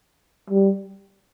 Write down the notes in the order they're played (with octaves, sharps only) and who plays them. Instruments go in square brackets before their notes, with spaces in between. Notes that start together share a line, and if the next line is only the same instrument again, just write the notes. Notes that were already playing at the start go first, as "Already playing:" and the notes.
[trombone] G3